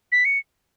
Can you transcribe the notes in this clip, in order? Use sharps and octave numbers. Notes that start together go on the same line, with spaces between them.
B6
C#7